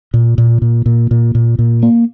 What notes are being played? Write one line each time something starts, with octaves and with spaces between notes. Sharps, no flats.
A#2
A#2
A#2
A#2
A#2
A#2
A#2
A#3